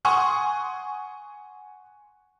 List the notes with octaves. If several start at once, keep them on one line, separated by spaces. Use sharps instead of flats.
F#5 G#5 C6 C#6 D#6